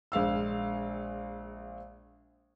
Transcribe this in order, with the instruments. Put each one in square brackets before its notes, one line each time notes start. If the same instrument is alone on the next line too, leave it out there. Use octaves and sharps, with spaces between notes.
[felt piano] A#1 G#3 F5 E6